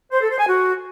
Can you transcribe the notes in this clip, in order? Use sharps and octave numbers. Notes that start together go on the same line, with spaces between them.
C5
A4
C5
G#5
F#4